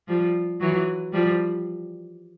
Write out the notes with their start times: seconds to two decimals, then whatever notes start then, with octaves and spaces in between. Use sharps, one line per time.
0.08 F3 G3
0.60 E3 F#3
1.13 F3 G3